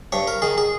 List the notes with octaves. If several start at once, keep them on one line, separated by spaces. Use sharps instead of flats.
G2 C#5
A#4
D#3 G#4
G#4